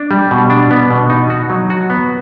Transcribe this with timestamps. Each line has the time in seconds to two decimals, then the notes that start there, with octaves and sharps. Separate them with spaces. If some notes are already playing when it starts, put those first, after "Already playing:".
Already playing: D4
0.11 G3
0.31 B2
0.50 D4
0.71 B3
0.91 B2
1.10 D#4
1.30 F#4
1.50 F#3
1.70 F#4
1.90 B3